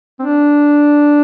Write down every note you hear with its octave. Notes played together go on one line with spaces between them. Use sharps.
C4
D4